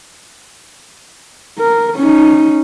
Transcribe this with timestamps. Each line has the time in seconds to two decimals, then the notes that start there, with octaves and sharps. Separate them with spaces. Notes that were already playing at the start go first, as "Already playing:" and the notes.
1.58 A#4
1.96 C#4 D#4